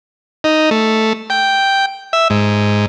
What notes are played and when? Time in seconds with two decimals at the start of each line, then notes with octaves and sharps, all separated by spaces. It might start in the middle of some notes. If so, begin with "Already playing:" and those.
0.44 D#4
0.71 A3
1.30 G5
2.13 E5
2.30 G#2